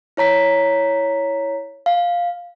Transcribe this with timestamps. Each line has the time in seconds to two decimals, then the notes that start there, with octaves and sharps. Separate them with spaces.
0.17 E4 C#5 A#5 B6
1.86 F5